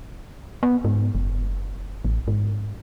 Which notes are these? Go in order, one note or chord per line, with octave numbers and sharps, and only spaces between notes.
B3
G#2
F#1
A1
G#2